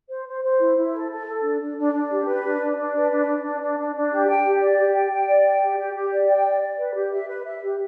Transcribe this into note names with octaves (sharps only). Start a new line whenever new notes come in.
C5
C5
C5
E4
E4
A4
A4
A4
D4
D4
D4
D4
G4
B4
D4
D4
D4
B4
D4
D4
D4
D4
D4
D4
G4
G5
G4
D5
G4
G5
G5
D5
G5
G4
G4
G4
D5
G5
D5
D5
B4
G4
E5
B4
E5
G4